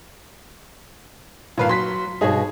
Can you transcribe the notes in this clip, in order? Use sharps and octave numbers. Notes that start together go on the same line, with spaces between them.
G2 A#2 D#3 B4 F5
F#3 C6 B6
G2 B2 D#4 G#4 C#5